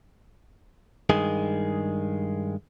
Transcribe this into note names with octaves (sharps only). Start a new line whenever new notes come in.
G2 D#3 G#3 G#4